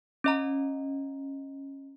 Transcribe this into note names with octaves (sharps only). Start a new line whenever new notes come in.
C#4 D#5 A#5